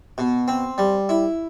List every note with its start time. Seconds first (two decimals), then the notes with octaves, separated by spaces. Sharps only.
0.18 B2
0.48 C4
0.78 G3
1.09 E4